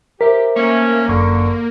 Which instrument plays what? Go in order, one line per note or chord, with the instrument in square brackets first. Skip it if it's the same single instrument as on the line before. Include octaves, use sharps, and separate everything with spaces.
[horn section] G4 [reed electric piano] A#4 [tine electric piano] C5 E5 B6
[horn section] A3 C#4 [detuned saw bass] A#3
[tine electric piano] G1 F#2 C#6 [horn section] D3